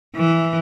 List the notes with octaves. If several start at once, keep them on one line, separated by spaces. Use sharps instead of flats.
E3